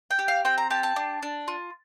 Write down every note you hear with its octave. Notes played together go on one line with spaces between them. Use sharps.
G5
G4
F5
C4 G5
A#5
G4 A5
A5
D4
D4
F4